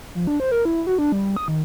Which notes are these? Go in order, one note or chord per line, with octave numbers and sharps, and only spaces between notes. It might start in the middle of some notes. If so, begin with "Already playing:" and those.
F3
D4
C5
A#4
E4
F#4
D4
G3
D#6
D#3